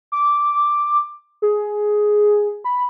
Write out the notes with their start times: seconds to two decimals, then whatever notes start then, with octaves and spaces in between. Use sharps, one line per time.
0.12 D6
1.42 G#4
2.64 B5